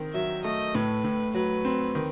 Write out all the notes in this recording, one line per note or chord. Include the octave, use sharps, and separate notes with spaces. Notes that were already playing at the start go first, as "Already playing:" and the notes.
Already playing: D#3 C4
F#3 E5
A3 D#5
A2 B4
A2
F#3 B4
C4
D#3